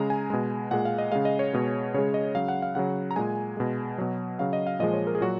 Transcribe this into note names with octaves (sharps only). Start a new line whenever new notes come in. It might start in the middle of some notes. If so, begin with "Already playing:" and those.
Already playing: C#3 G#3 A#5
G#5
B2 G#3
A#2 G#3 F#5
F5
D#5
C#3 G#3 F5
D#5
C#5
B2 G#3
C#3 G#3 C#5
D#5
C#3 F#3 F5
F#5
F5
C#3 F#3 F#5
A#5
A#2 G#3 G#5
B2 G#3
B2 F#3
C#3 F#3 F5
D#5
F5
A#2 F3 G#3 D#5
C#5
A#4
G#4
A#2 F#3 F#4